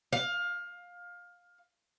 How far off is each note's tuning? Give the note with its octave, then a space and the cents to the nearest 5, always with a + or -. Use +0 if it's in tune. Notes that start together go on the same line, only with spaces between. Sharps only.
F5 +20